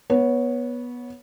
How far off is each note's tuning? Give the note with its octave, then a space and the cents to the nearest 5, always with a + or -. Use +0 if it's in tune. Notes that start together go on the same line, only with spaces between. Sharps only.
B3 -15 C#5 +0